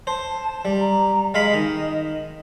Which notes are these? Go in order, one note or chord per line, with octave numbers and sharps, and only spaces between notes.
C5 A5
G3
A#5
G#3 D#5 F5 B5
D#3